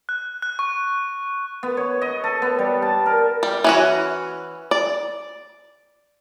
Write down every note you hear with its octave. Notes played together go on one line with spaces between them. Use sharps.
F#6
F#6
C#6
B3
C#5
D#5
A4
B3
G3
A5
A#4
G3
E3 C#4 F#4
D5